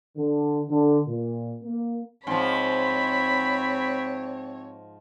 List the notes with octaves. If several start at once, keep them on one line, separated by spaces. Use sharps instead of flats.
D3
D3
A#2
A#3
G#2 F3 C4 C#5 B5